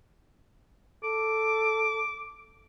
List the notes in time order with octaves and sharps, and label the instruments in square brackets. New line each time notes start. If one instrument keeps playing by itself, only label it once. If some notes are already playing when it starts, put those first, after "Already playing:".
[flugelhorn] A4 [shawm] D6